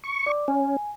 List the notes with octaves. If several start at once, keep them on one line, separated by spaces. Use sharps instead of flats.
C#6
D5 D6
C#4 G#5